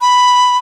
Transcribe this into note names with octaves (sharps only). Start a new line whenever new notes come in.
B5